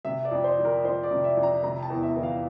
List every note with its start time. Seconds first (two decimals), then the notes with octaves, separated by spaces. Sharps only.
0.05 C3 E5
0.25 D5
0.31 F2
0.44 C5
0.58 F3
0.65 A#4
0.84 F2 C5
1.03 D5
1.11 C3
1.24 E5
1.37 F2
1.43 A#5
1.64 C3 A#5
1.83 A5
1.90 E2
2.03 E5
2.17 E3
2.23 F5